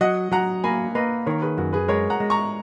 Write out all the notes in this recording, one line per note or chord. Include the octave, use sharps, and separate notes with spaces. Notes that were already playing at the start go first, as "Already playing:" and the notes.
F#3 D#5 F#5
F#3 F#5 A#5
A#3 G#5 B5
A#3 B4 D#5
D#3 A#4 C#5
G#4 B4
F#2 F#4 A#4
G#4 B4
G#3 A#4 C#5
F#5 A#5
G#3
A#5 C#6